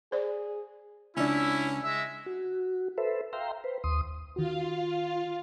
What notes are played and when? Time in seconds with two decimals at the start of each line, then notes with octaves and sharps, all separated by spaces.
0.12 G#4 C5 D5
1.17 C#2 C#4 D4 E4
1.83 G#3 E5
2.26 F#4
2.98 A4 B4 C5 E5
3.33 E5 F5 G5 A#5 C6
3.64 B4 C5
3.84 D#2 C6 D#6
4.36 D#3 F4 F#4 F5